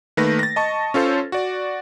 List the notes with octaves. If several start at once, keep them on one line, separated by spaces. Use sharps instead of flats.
D#3 A3 A#3 B4 A#6
A6 A#6
D#5 A5 C#6
C#4 F4 A4 C5 C#5
F#4 D5